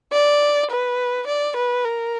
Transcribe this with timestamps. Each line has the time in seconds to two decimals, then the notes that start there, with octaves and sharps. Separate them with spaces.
0.13 D5
0.70 B4
1.27 D5
1.56 B4
1.84 A#4